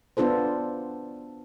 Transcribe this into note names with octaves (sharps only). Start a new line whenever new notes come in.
B3 D4 F4 A4 C5